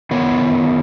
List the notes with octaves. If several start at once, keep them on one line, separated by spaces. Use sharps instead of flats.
D#3 B3 C#5